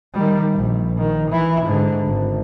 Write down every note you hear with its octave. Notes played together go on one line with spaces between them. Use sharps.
D#3 G3
A#1
D#3
E3 E4
G#2 D3
G#1